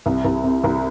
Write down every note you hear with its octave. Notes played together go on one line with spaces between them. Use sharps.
C2
C2
C3
C2